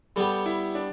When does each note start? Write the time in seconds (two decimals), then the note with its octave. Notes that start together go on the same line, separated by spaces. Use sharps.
0.16 G3 B3 G4 A4
0.46 E4
0.75 D4